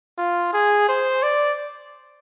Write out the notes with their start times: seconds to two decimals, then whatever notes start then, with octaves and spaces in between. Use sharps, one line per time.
0.18 F4
0.53 G#4
0.89 C5
1.23 D5